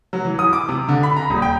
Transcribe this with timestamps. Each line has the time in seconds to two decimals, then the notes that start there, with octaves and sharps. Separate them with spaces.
0.13 F#3
0.25 E3
0.39 D#6
0.53 D6
0.69 C3
0.88 D3
1.03 B5
1.16 A#5
1.30 D#1
1.42 G5